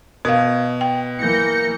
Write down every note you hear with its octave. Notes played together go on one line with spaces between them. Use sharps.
B2 A#4 F5
G5
E3 A#3 G6 A#6 C#7